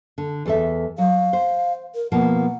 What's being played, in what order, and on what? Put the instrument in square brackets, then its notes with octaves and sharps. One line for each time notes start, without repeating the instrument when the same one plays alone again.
[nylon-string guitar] D3
E2 A4 E5
[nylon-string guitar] F#3 [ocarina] F5
[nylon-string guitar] C5
[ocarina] A#4
[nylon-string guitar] B2 F3 A#3 [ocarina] F#5